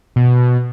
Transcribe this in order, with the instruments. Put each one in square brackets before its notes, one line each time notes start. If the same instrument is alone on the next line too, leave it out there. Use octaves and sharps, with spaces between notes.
[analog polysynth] B2